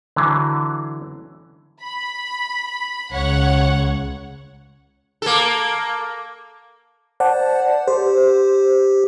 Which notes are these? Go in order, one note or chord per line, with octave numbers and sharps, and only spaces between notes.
D3 E3 F#3
B5
C#2 C#5 F#5
A#3 A4
C5 D5 F#5 A5
G4 C5